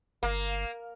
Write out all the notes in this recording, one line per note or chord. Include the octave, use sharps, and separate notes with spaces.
G1 A#3